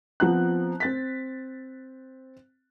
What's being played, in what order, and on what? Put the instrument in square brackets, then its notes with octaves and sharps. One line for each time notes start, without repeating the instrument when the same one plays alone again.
[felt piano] F3 B3 C4 A#5 F#6
C4 A6 B6